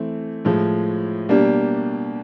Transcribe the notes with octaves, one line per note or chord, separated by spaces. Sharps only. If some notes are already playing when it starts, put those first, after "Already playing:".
Already playing: E3 A3 C4
A2 F3 G#3
B2 G3 A#3 D4 G4